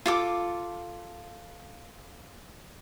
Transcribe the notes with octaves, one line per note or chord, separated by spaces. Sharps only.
F4 A4 D6